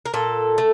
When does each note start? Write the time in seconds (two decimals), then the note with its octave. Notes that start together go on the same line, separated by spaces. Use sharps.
0.06 A#4
0.14 A#2 A4
0.58 A3